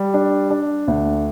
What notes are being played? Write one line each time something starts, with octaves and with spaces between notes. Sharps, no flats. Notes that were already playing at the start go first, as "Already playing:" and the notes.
Already playing: G3
D4
D4
D2